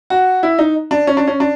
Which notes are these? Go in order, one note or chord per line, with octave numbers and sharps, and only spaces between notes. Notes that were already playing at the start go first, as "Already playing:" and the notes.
F#4
E4
D#4
D4
C#4
D4
C#4
D4